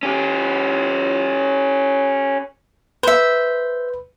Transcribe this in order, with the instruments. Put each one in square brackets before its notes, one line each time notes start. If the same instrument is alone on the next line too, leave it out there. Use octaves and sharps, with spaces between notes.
[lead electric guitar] C#4 G4
[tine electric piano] B4 [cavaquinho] C5 E5